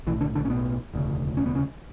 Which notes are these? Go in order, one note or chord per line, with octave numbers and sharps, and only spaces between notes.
B1 A2 E3
D3 D4
D3 D4
C#4
B2 B3
E1 D2 C#3
C#4
B3
C#3 C#4